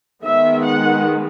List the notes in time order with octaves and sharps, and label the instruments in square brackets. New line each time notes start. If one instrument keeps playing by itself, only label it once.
[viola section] D#3 G#3 B3 E5
F#5